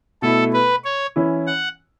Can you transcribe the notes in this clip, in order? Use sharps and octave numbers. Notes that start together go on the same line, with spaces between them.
B2 A3 E4 A4
B4
C#5
E3 C#4 E4
F#5